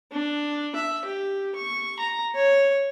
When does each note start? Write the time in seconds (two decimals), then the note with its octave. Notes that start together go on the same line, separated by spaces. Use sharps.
0.12 D4
0.76 E5
1.05 G4
1.55 C#6
1.99 A#5
2.35 C#5